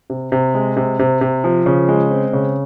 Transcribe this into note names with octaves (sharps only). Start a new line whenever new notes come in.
C3
C3
G#3
C3
C3
C3
F3
C#3
G#3
C4
C#3